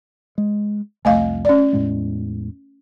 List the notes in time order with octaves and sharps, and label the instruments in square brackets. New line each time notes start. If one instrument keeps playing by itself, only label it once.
[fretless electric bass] G#3
[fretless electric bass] C2 F2 [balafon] A3 D#5 F5
[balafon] C#4 D5
[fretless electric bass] E2 A2 G#3